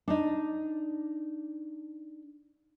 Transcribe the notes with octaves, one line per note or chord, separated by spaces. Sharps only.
D4 D#4